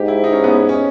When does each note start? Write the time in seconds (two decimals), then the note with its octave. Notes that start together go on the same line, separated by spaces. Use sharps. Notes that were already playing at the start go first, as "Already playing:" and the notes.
Already playing: G#2 G4
0.08 E4
0.24 D#4
0.33 C#4
0.44 B3
0.69 C#4